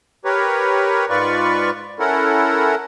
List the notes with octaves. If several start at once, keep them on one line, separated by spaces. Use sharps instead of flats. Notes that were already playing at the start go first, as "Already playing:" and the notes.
G4 A#4 B4 C#5
G#2 F4 B4 D5 C#6
C#4 E4 A4 A#4 F#5